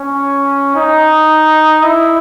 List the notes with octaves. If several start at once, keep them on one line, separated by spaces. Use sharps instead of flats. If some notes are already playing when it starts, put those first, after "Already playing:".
Already playing: C#4
D#4
E4